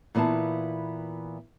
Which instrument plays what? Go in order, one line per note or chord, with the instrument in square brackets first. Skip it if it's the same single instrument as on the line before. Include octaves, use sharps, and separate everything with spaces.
[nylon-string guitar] A#2 E3 B3 F4 A5